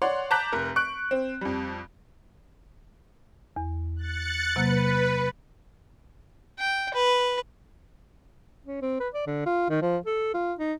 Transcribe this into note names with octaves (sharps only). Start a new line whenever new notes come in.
C#5 D5 F#5 C6
A5 A#5 D6 F#6 G6 B6
F1 A#4
C#6 F#6 D7
C4
F2 G3
E2
F#6 A6 C#7
C3 F#3 A#3 B4
G5
B4
C#4
C4
B4
D5
D3
F4
D#3
F3
A4
F4
D#4